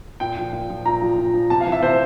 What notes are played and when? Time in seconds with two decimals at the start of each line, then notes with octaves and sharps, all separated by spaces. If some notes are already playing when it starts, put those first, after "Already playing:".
0.20 A#2 G5
0.37 F3
0.53 A#2
0.69 F3
0.85 A#2 A#5
1.02 F3
1.18 A#2
1.34 F3
1.50 C3 A5
1.60 F5
1.66 E3
1.72 E5
1.83 C3 C5